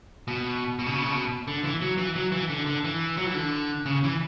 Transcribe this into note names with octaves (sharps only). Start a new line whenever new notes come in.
B2
B2
C#3
B2
C#3
B2
D3
E3
F#3
E3
F#3
E3
D3
D3
E3
F#3
E3
D3
C#3
E3